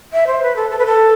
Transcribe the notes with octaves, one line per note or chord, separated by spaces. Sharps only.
E5
C5
B4
A4
A4
B4
A4